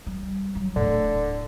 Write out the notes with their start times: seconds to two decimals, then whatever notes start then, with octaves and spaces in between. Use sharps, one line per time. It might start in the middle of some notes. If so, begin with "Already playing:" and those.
0.07 G3
0.55 F#3
0.76 D1 A2 D3